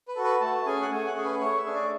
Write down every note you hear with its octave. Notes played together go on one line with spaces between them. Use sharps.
B4
F#4 A4
B4
A3 A5
C#4 G#4 G#5
F#5
A3 G#5
F#5
C#4 G#4
B4
A3 C#5
E5
D4 G#4
D5